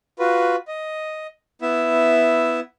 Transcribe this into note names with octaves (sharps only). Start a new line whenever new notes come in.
F4 F#4 B4
D#5
B3 E4 E5